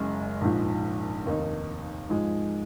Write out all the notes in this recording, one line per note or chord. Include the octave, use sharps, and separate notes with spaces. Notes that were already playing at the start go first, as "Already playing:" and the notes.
Already playing: F#1 F#2 C#3 G#3
A#1 G#2 F3
F1 D#2 D#3 A#3 D#4
G#2 F3 G#3